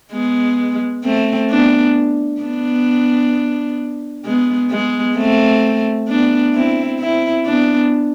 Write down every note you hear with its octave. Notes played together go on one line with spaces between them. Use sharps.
G#3 B3
A3 C4
B3 D4
B3 D4
G#3 B3
G#3 B3
A3 C4
B3 D4
C4 E4
C4 E4
B3 D4